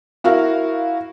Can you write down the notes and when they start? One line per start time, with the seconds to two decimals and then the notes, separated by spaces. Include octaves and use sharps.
0.24 E4 F#4 A#4 F5